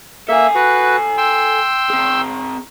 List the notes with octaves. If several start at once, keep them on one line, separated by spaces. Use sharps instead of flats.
A#3 A4 E5 G#5
F#4 B4
G5 C6 E6
C4 G#4